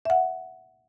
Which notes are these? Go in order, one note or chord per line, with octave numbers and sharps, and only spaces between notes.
E5 F#5